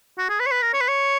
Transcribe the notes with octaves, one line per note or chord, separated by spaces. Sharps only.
F#4
G#4
B4
C#5
B4
A#4
C#5
B4
C#5